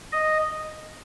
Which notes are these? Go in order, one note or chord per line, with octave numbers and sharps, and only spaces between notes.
D#5